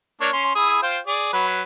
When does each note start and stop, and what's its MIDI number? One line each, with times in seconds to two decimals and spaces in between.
0.21 0.30 58
0.21 0.30 62
0.21 0.30 73
0.33 0.55 61
0.33 0.55 84
0.55 0.81 64
0.55 0.81 68
0.55 0.81 87
0.83 0.99 65
0.83 0.99 72
0.83 0.99 79
1.07 1.30 68
1.07 1.30 74
1.33 1.62 54
1.33 1.62 71